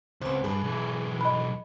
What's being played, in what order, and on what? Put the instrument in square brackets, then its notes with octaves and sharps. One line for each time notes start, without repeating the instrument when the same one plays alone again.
[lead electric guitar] C#2 [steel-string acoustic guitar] B3 C4
[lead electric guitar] G2 [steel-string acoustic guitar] G#4 B4
[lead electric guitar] B1 E3
[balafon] D#5 B5